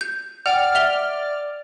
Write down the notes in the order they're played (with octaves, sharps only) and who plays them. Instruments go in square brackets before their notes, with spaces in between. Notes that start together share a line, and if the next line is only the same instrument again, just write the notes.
[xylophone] G6
[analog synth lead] D5 [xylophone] F#5 G5 [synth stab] F6
[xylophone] E5 F7 G7